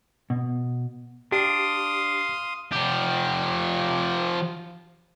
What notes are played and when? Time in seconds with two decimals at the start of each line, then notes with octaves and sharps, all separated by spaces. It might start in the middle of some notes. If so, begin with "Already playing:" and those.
0.30 B2
1.32 D4 G4 F5 C6 D#6
2.72 F3 G4